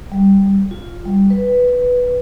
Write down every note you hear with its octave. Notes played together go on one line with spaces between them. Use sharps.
G3
F4
G3
B4